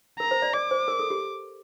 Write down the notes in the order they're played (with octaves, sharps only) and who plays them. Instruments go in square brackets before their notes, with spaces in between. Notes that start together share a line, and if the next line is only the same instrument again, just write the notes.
[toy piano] A#4 [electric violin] A#5
[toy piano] C5
D5
[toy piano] D5 [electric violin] D6
[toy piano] C5
A#4
A4
G4